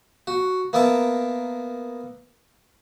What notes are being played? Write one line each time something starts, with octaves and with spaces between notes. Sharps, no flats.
F#4
A#3 B3 A#4 E5 A5